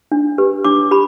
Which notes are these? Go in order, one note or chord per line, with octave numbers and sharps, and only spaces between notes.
D4
G4 B4
D4 D6
G4 B5